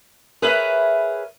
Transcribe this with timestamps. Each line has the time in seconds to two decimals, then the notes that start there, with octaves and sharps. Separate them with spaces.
0.42 G#4 A#4 B4 C#5 E5